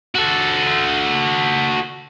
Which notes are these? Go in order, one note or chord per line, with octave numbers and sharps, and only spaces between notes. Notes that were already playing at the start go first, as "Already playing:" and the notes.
F#4 A4